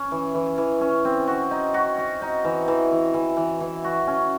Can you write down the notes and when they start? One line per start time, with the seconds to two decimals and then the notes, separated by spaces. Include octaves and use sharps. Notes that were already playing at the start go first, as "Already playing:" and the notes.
Already playing: C#4
0.11 E3
0.35 E3
0.58 E3
0.81 C#4
1.05 C4
1.27 F#4
1.51 D#4
1.74 F#4
1.98 F#4
2.22 D#4
2.44 E3
2.68 E3
2.91 E3
3.14 E3
3.37 E3
3.60 E3
3.84 F#4
4.07 C#4